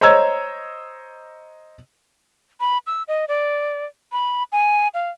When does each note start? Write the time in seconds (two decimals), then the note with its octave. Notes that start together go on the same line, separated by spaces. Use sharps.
0.01 C5 C#5 D#5 A#5 E6 G#6
2.60 B5
2.87 E6
3.08 D#5
3.28 D5
4.12 B5
4.52 G#5
4.94 F5